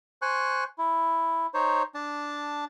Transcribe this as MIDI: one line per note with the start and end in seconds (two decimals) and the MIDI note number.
0.22 0.64 72
0.22 0.64 80
0.22 0.64 85
0.22 0.64 90
0.78 1.47 64
1.54 1.83 63
1.54 1.83 72
1.54 1.83 73
1.95 2.65 62
1.95 2.65 81